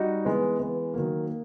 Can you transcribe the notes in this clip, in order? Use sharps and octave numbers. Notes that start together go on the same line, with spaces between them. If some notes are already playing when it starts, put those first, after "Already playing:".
Already playing: G3 D#4 F#4
E3 G#3 B3
E3 G#3 B3
D#3 F#3 A#3
A#3